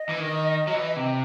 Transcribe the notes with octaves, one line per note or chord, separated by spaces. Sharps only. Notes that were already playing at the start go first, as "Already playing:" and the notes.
Already playing: D#5
E3
D#3
F#3
E3
C3